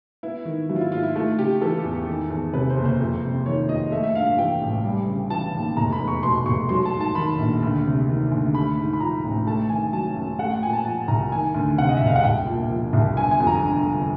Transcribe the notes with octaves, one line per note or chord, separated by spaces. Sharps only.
B3 E4
D#3
F#3 E4
F4
E4
G#2 F4
E4
A3 F4
C#3 G4
E3 A4
E2
D#3
E2
C3 B4
C5
F#1
C5
F2
C3
D#3 C#5
F2 D#5
A3 E5
E5
G2 F5
F5
E3 G5
A1
G3
C#3
E3 A5
D#2
F1 A#5
B5
E2
C#6
B2 C6
F1 C#6
F#3 C6
A5
G#2
A5
D#3 B5
A#1
D2
C3
D#3
D2
A3 B5
G#2
B5
F3 A#5
A1
A3 A5
D#3 G#5
F#3 A5
F#2
A3 F#5
G5
A#2 G#5
A5
F3 A5
C2 A#5
D#3 G#5
D2
C3 F#5
D#5
E5
E1
F5
F#5
C2 G5
A#2
F3
C2
G1 G#5
G#5
F2
A#5
D3
G1